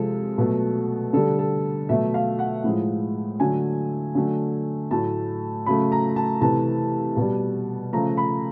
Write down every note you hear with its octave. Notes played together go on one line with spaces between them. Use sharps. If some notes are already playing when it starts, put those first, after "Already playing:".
Already playing: C3 F3 G#3 A4
B2 F#3 A3
D3 G3 A4
A4
B2 F#3 A3 E5
F5
F#5
A2 F3 G#3
D3 F#3 A3 G#5
D3 F#3 A3
A2 F#3 A3 A5
C#3 F#3 A3 B5
A#5
A5
C3 E3 A3 A5
B2 G3
C#3 F3 A3 A#5
B5